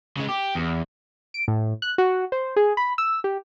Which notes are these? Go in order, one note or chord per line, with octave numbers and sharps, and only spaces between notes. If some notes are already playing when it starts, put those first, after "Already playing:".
C#3 G#3
G4
E2
D7
A2
F#6
F#4
C5
G#4
B5
E6
G4